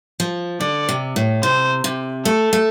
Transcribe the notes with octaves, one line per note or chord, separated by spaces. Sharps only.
F3
D3 D5
C3
A2
C3 C5
C3
A3 A4
A3